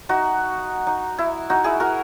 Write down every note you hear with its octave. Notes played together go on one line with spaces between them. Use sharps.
D#4 F#4
D#4
E4
D#4 F#4
E4 G#4
F#4 A#4